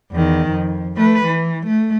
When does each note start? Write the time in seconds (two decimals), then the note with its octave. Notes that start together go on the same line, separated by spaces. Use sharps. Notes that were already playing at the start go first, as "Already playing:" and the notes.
0.12 E2 D#3
0.50 F2
0.97 A3 B4
1.25 E3
1.67 A3